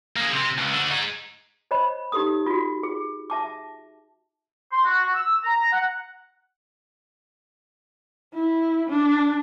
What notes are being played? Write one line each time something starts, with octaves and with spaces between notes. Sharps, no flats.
A#3 G#4
C3 C4
C#2
D3 F#4
D#4 G#4
C5 C#5 D#5 B5
D#4 G4 A4 D#6
F4 F#4
G#4
E5 A5 D6
C6
F#4
E6
A#5
F#5
E4
D4